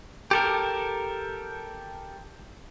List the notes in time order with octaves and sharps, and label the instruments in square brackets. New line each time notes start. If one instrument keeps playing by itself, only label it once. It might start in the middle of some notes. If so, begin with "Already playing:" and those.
[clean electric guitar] G4 A4 A#4